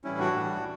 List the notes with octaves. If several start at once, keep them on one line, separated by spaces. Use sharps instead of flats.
A2 E3 G3 C#4 E4
D4 F#4
A2 E3 G3